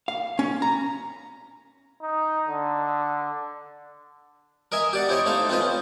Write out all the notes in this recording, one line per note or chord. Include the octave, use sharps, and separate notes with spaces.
F5
C#4
A#5
D#4
D3
A#4 D#5 E5 G#5
G4 D5 F#5
E4 C5 C#5 D#5
A3 D#4 C5 F5
C4 F4 B4 C5 D#5
C#4